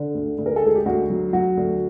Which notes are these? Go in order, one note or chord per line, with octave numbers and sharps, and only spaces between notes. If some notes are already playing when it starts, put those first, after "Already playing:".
Already playing: D3
D2
D2
A#4
A4
G#3 G#4
G4
D2 F#4
F#3
F#3 F#4
D2